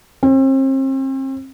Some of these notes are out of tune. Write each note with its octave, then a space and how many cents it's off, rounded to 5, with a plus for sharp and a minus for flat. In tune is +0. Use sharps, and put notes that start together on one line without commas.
C4 +40